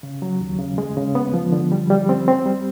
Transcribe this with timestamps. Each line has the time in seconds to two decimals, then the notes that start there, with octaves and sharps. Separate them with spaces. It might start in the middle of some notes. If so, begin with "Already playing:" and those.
0.03 C#3
0.22 F#3
0.41 D#2
0.59 C#3
0.78 G#3
0.97 C#3
1.15 B3
1.34 F3
1.52 D3
1.72 G3
1.90 G3
2.09 C4
2.28 C4
2.46 G3